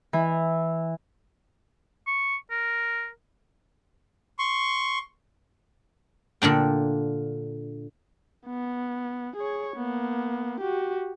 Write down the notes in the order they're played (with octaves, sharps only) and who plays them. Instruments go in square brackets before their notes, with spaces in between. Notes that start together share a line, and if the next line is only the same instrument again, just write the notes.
[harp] E3
[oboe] C#6
A#4
[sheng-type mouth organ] C6 C#6
[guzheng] A#2 D3 D4 G5
[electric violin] B3
G#4 C#5
A#3 B3
F#4 G4